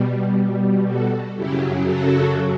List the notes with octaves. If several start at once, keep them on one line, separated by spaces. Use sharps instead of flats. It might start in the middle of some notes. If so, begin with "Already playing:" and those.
Already playing: B2 G3
F#4 A4
F#2 C#3 F#3 E4 G4
F#4 A4